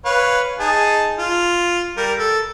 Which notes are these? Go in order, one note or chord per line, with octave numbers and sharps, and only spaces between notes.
B4 C#5 F5
D#4 G#4 A5
F4
G3 A#4
A4